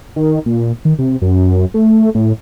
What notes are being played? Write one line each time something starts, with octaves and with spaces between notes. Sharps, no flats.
D#3
A#2
D#3
C3
F#2
A3
A2